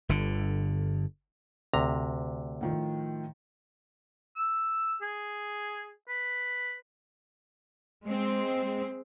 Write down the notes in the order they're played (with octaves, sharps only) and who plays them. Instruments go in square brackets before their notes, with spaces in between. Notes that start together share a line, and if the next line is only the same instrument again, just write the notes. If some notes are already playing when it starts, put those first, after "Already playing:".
[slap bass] G1 D3
[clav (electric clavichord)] D2 C3 A#5
[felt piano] A2 D#3 F3
[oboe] E6
G#4
B4
[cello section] G#3 C4